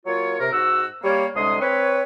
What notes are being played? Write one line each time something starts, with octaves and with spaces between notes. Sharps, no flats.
F#3 A#3 F4 C#5
C3 A#4
G#2 F#4 E6
G3 A#3 C#5
C2 D3 G#3 C6 D#6
C4 B4 C#5